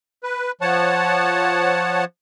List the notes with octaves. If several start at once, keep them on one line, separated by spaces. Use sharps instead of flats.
B4
F3 C#5 F#5 A5